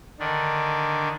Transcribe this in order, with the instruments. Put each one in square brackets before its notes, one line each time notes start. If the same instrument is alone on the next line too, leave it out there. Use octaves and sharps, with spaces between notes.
[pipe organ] D3 D#3 D4